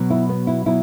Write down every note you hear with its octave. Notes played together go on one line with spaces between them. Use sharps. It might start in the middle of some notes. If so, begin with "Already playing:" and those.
Already playing: B2 F#3
E4
B3
E4
B2 F#3 E4